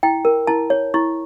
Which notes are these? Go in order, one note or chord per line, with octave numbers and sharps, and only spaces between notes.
E4 G5
A#4
E4 A5
C#5
E4 C#6